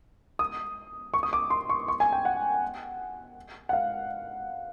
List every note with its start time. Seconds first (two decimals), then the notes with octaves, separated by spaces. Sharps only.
0.39 D#6
1.14 C#6
1.23 D#6
1.33 D6
1.50 C6
1.69 C#6
1.88 C#6
2.00 G#5
2.12 G5
2.25 F#5
3.69 F#5
3.73 F5